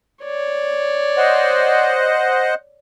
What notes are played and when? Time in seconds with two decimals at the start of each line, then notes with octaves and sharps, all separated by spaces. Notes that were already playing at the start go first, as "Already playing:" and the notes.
0.24 C#5 D5
1.18 C5 D#5 F#5